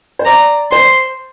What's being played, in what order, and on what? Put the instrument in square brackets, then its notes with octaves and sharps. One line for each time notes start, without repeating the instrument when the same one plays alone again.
[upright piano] C5
[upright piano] D5 [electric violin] A#5
[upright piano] C5 [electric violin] C6